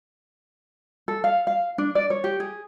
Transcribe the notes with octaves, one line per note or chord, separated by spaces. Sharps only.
A4
F5
F5
D4
D5
C#5
G4
G#4